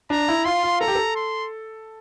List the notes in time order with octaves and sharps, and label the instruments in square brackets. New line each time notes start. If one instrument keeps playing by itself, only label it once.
[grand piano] D4 [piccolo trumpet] A#5
[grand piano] E4
[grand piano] F4 [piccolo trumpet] C6
[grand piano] F4
[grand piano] A4 [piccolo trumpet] A#5
[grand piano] G4
A4
[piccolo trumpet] C6